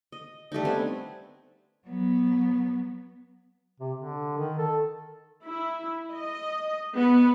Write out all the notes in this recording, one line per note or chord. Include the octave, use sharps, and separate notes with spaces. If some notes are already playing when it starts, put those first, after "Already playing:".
D#5
G3 A3 D4 D#4
B3 C4 D4 G#5
F#3 B3
C3
D3
D#3
A4
E4
D#5
B3